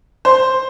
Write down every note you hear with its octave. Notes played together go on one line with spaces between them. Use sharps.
C5